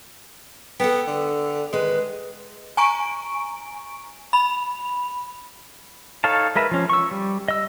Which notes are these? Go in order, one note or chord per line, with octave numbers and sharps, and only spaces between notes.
B3 A4 F#5 G5
D3
D#3 G#3 B4
G#5 A#5 C#6 D7
B5 F7
D#4 A4 C#5 F5 A5
G#3 A#4 B4 E5
F3 C#4
C#6 E6
G3
D#5 E6